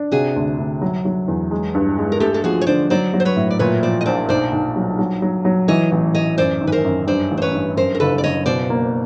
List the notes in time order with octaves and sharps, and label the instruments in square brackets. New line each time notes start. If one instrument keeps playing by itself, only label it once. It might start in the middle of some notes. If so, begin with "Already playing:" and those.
Already playing: [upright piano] D4
[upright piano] C3 [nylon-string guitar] F#4 G#4
[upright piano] D2
D2
F#3
F#3
E2
G#3
G2
G#3
[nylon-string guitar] A#4
[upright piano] A3 [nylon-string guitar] G4 A4
[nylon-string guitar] A4
[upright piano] F3 [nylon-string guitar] F#4 G#4
[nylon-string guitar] C#5
[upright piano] D3 [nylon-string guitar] C5 D5
[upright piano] F#3 [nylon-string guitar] C5 D5
[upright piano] F#3
[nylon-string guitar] C5
B4 C#5
[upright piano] A2
[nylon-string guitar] D5
[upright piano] A#2 [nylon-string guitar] B4 C#5
[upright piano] F3 [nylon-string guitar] C5 D5
[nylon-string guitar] D#5
[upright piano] A#1 [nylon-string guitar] C5 D5
[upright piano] B1 [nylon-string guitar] C5 D5
[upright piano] B1
F#3
F#3
F#3
F#3
[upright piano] E3 [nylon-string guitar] C#5 D#5
[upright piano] A1
[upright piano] A1 [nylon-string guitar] C#5 D#5
[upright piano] F#2 [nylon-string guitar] C5 D5
[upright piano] G#1
[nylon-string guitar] B4
A#4 C5
[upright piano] F#2
[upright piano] G2 [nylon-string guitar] C5 D5
[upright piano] A1
[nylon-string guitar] C5
B4 C#5
[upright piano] G2
[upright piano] F#2 [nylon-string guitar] A#4 C5
[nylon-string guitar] A#4
[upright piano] F#1 [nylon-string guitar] A4 B4
[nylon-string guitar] D5
[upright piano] F#1 [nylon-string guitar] C#5 D#5
[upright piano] B2 [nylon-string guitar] C5 D5
[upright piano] A#3